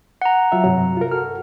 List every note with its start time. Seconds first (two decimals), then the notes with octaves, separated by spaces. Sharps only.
0.22 F#5 A#5
0.52 F#3 F4 E5
0.64 G2 C3 F#3
0.97 F4 A#4
1.11 F#4 A4 F6